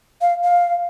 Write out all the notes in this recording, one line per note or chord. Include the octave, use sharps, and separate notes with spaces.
F5
F5